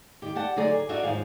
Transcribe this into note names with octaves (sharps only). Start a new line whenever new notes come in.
D#3 G4
G4 D5 F#5 A5
D3 F#3 A3 D#4 G#4 D5
G#4
D4 D#4 F#4 D5 E5
D#2 G#2 F3 G#4 F5